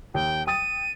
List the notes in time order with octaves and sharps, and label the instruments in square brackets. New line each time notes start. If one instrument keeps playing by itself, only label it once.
[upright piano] D#2 [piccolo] G5
[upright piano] G5 D#6 A6 [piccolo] D#7